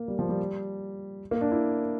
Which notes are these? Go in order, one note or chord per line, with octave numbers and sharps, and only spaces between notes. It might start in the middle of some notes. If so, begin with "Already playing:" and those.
Already playing: A#3
G3
F3
G3
A#3
D4
E4